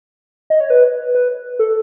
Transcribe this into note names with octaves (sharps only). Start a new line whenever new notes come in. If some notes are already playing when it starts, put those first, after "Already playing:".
D#5
C#5
B4
B4
A4